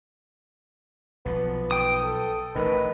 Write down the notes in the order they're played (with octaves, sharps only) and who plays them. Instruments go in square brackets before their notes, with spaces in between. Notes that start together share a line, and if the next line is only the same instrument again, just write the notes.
[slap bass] B1 F3 [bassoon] B3
[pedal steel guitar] G5 D#6
[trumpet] A4
[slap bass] A1 A2 [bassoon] D#3 [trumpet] B4